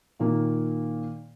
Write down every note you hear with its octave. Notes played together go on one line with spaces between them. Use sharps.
A#2 D#3 A#3